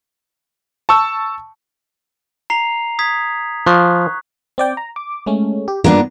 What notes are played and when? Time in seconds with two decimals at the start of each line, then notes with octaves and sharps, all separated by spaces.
0.89 A5 C#6 E6
2.50 A#5 C7 F7
2.99 D#6 G#6 B6
3.66 F3 C#6 F#6
4.58 C4 D5 G5
4.77 A#5
4.96 D6
5.26 G#3 A3 C#4
5.68 G4
5.84 G2 A#3 B3 D4 F4